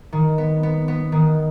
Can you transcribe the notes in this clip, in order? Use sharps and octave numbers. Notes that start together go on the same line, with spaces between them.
D#3
B3
B3
B3
D#3